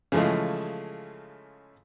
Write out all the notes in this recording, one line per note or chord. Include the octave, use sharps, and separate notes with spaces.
C#3 E3 F3 G#3 A3